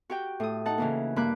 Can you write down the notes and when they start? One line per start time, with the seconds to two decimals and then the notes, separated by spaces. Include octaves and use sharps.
0.10 F#4 G4 G5
0.40 A2 D#6
0.66 D#4 F#5 A5
0.78 C#3 E3 A#3
1.16 G2 A#3 B5 D6 F#6